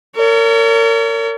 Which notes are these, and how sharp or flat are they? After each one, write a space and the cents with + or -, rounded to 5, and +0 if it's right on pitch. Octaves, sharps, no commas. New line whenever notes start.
A#4 -30 C#5 +40